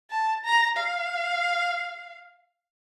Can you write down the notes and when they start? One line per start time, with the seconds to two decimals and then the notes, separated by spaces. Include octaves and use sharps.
0.11 A5
0.44 A#5
0.77 F5